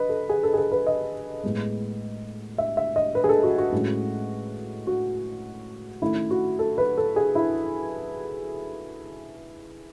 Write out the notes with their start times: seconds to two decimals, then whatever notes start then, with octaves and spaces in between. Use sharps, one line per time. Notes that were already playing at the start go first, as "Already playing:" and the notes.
Already playing: B4 D#5
0.09 A4
0.29 G#4
0.43 A4
0.54 G#4
0.58 A4
0.72 B4
0.87 D#5
1.43 A2 G#3 B3
2.58 E5
2.77 E5
2.96 D#5
3.15 B4
3.24 G#4
3.29 A4
3.43 F#4
3.58 F#4
3.72 A2 G#3 C#4
4.87 F#4
6.02 D#3 A3 C#4 E4
6.31 F#4
6.59 A4
6.78 B4
6.97 A4
7.16 G#4
7.35 E4